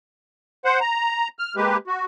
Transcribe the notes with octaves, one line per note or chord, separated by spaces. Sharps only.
C5 F#5
A#5
F6
G#3 A#3 G4 B4
F#4